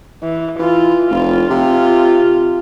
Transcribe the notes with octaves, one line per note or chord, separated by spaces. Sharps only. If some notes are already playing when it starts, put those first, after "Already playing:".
E3
E3 F4
F1 F4
C3 F4